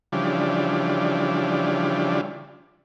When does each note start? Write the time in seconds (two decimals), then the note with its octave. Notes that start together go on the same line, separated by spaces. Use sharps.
0.12 C#3 E3 F3 G3 D4